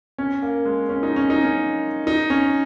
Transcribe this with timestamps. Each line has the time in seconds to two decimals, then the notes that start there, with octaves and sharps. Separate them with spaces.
0.18 C#4
0.42 A#3
0.65 G#3
0.89 C#4
1.03 D#4
1.16 C#4
1.30 D#4
1.44 C#4
2.07 D#4
2.30 C#4